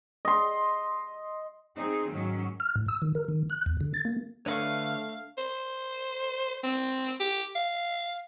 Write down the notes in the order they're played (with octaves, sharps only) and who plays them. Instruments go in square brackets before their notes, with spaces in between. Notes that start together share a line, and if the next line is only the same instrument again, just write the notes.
[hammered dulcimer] D#5 C6
[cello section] C4 D#4 G#4
G#2 D#3 F#3 C#4
[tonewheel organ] F6
A2
E6
D#3
A#4
D#3
F#6
E2
D3
A6
A#3
[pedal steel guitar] D3 B4 C#5 [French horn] A3 [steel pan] D4 F#5 C#6 [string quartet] F5
[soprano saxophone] C5
C4
G4
F5